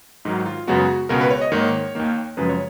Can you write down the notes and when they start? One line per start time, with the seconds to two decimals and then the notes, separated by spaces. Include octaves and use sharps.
0.25 G#2 D#3 F#3 D#4
0.46 F4
0.67 F#2 C#3 G#3 B3 F#4
1.09 C#2 B2 G#3 B3 A#4
1.21 B4
1.30 C#5
1.41 D#5
1.52 G#2 D#3 A#3 C#5
1.95 D#2 D#3 A#3
2.37 F#2 C#3 F3 G#3 B4
2.49 C#5